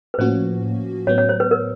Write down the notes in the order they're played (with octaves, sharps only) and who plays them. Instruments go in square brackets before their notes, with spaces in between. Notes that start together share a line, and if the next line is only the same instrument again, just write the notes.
[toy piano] B4
[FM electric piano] A2 F3 A#3 C#4 F#4 [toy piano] C5
[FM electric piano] A2 F#3 B3 [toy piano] C#5
[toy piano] C#5
C5
B4
A#4